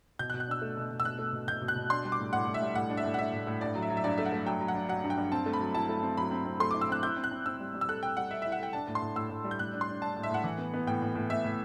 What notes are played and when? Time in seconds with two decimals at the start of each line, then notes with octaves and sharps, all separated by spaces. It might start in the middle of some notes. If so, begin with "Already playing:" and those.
0.19 B2 G6
0.30 F#6
0.34 B2
0.40 F#6
0.47 D4 E6
0.62 A3
0.77 B2
0.90 B2
1.00 E6
1.05 B2 F#6
1.19 A3
1.33 B2
1.47 B2 G6
1.61 B2
1.68 F#6
1.76 B2
1.90 D4 C6
2.05 G3
2.12 D6
2.19 A2
2.33 A2 F#5
2.47 A2
2.54 E5
2.62 G3
2.75 A2 F#5
2.90 D4
2.97 E5
3.04 A2
3.14 F#5
3.18 D4 E5
3.32 A2
3.47 A2
3.61 G2 D5
3.75 F#3
3.82 E5
3.90 F#3
3.97 E5
4.04 G2 D5
4.18 A3 E5
4.26 F#5
4.33 A3
4.46 F#3 G5
4.61 F#3
4.68 F#5
4.75 D4
4.89 F#3 F#5
5.04 G2
5.10 G5
5.17 G2
5.32 C4 A5
5.46 A3
5.53 B5
5.60 F#3
5.75 E4 A5
5.89 A3
6.03 C4
6.18 F#3 B5
6.31 C4
6.45 C4
6.60 A3 C6
6.71 D6
6.74 E4
6.81 E6
6.89 C4 F#6
7.03 E4 G6
7.17 C4
7.24 F#6
7.31 C4
7.46 C4 E6
7.60 G3
7.74 G3
7.81 E6
7.89 A4 F#6
8.03 A4 G5
8.17 G3 F#5
8.31 A4 E5
8.42 E5
8.45 E4
8.52 F#5
8.59 A4 G5
8.73 D4 A5
8.87 A2
8.95 C6
9.02 A2
9.16 A2 E6
9.30 A2
9.44 G3
9.51 G6
9.59 A2 F#6
9.73 D4
9.81 C6
9.88 D4
10.01 D4 A5
10.17 A2
10.23 E5
10.31 A2 F#5
10.44 E3
10.58 B3
10.74 B3
10.87 A2 G5
11.02 A2
11.15 A2
11.30 A2 E5
11.45 A2